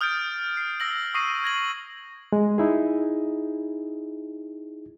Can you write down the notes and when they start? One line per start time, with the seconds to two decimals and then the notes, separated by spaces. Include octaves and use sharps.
0.01 D#6 F6 G6 A6 D7
0.57 C7
0.80 E6 A#6 F#7
1.14 C#6 D#6 A#6 C7 D#7 F#7
1.44 G#6 A#6 F#7
2.33 G#3
2.58 D#4 E4 G#4